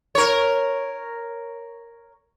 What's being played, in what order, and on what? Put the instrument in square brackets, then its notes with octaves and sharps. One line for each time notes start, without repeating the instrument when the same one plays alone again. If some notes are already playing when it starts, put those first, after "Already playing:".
[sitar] A#4 C#5